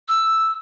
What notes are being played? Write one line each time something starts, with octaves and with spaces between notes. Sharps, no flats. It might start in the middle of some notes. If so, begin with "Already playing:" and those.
E6